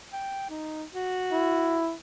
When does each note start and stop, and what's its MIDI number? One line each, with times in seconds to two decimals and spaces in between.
0.13 0.49 79
0.50 0.83 63
0.93 1.82 66
1.32 1.94 64